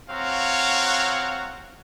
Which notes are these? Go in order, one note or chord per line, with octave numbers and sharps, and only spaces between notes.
C4 F#4 C#5 F5 A#5